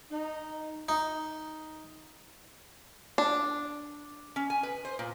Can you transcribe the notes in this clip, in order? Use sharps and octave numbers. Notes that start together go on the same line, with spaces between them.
D#4
D#4
D4
C#4
G#5
B4
C5
A#2